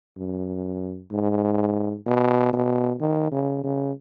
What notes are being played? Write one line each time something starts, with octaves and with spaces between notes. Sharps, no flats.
F#2
G#2
B2
B2
D#3
C#3
C#3